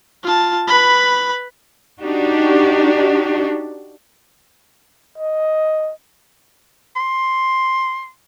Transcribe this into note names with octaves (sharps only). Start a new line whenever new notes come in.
F4 A5
B4 B5
D4 D#4 F#4 G4
D#5
C6